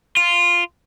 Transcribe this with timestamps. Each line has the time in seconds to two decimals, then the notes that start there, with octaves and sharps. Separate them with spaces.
0.17 F4